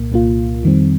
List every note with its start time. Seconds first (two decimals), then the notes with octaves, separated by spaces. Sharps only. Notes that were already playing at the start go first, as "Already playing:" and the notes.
Already playing: C2 A#2 A#3
0.12 C2 A#2 A#3 F4
0.64 F2 D#3 G3 C4